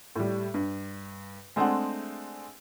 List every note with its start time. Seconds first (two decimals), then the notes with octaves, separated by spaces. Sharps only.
0.16 A2 G3
0.54 G2
1.56 G#3 A3 C4 D4 G#4 F#5